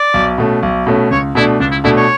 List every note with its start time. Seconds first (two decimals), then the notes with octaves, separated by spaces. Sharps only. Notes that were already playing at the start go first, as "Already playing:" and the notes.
Already playing: D5
0.14 B1
0.38 B2 A3 C#4
0.63 B1
0.87 B2 A3 C#4
1.11 C#2 C#5
1.35 B2 A3 D4 E4
1.60 C#2 D4
1.71 E4
1.84 B2 A3 D4 E4
1.96 C#5